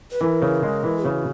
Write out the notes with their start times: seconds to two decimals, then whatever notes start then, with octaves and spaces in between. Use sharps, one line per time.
0.11 B4
0.21 E3 A#4
0.42 C#3
0.63 G#3
0.84 E3
1.04 C#3 F#4